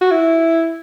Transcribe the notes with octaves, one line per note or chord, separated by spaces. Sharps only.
F#4
E4